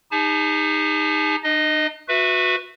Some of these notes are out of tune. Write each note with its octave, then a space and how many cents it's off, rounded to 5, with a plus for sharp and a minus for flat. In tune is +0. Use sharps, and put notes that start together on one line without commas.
D#4 +0 G#4 -45 A5 -40
D#4 -45 D#5 +0
F#4 -20 B4 +0 E5 +0